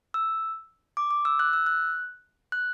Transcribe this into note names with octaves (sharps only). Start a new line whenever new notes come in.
E6
D6
D6
E6
F#6
E6
F#6
F#6